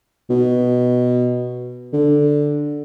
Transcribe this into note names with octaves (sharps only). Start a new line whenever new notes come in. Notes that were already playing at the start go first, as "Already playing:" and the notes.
B2
D3